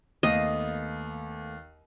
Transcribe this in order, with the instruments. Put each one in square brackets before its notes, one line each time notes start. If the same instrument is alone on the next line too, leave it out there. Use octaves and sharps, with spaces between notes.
[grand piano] D#2 [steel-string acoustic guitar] A3 B3 F5 [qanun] D#5